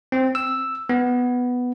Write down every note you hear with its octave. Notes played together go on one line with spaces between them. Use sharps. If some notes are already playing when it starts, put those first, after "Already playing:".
C4
E6
B3